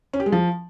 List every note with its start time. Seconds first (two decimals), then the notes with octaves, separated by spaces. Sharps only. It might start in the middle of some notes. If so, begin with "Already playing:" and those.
0.13 C#4
0.20 G4
0.26 G#3
0.32 F3